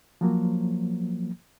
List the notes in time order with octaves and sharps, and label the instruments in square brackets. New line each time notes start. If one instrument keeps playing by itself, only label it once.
[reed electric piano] F3 F#3 A#3